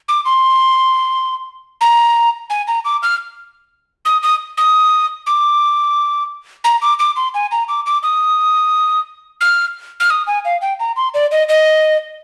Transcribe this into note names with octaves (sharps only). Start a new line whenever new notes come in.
D6
C6
A#5
G#5
A#5
D6
F6
D#6
D#6
D#6
D6
A#5
D6
D6
C6
G#5
A#5
D6
D6
D#6
F6
F6
D#6
G#5
F5
G5
A#5
C6
D5
D#5
D#5